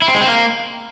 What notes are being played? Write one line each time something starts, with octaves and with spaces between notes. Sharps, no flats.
E4
C4
G#3
C4
A#3